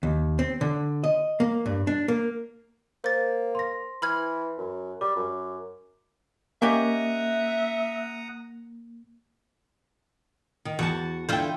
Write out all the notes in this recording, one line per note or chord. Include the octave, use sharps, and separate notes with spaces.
D#2
C4
D3
D#5
A#3
G2
D4
A#3
A#3 C5 A6
C6 A#6
E3 B5 F6 G#6
F#2
G3 D6
F#2
A#3 C#4 G4 D#5 E5 F#5 A#5 D#6
D#3
E2 F#4 F#5 A5
D3 E4 F4 C5 G5